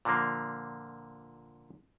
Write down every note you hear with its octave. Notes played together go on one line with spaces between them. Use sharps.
A#2 D3 F3 A#3